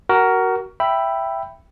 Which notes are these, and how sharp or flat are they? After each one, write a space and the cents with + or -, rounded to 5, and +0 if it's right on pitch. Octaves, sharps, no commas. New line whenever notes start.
F#4 +25 A#4 +0
E5 +10 G5 +0 B5 +0